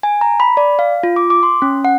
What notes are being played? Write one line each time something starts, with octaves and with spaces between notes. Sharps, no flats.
G#5
A#5
B5
D5
F5
F4
D6
D6
C6
C#4
F#5